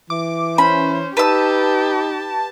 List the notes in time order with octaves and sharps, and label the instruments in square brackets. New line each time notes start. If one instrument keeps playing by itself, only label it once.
[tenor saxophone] E3 [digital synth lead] D6
[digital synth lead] C#4 [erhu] C5 [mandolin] B5
[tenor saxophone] D#4 [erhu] G4 [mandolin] B4 E6 [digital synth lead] A5